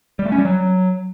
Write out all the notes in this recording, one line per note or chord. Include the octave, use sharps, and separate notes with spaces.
G3
A3
C#4
G3
F#3